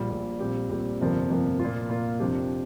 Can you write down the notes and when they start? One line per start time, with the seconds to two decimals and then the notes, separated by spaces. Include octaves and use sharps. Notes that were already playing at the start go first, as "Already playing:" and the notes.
Already playing: A#1 A#2 G3
0.10 A#1 A#2 G3
0.40 A#1 A#2 G3 C4 G4
0.69 A#1 A#2 G3 C4 G4
1.01 G1 F2 C3 F3 A#3
1.30 G1 F2 C3 F3 A#3
1.59 A#2 A#3 F4
1.89 A#2 A#3 F4
2.20 F2 C3 F3 D4 G4